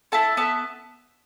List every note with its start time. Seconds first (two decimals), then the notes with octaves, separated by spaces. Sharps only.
0.12 E4 A4 E5 A5
0.37 B3 E5 A5